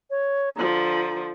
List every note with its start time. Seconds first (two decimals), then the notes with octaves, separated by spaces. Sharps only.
0.10 C#5
0.56 D3 F3 A#5